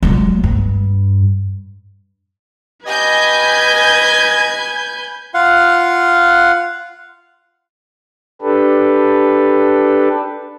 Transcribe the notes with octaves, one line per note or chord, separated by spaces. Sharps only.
F#3 G#3
G2
G4 B4 D#5 G#5 G6 G#6
F4 F5 F#5
D4 G4 A4 B4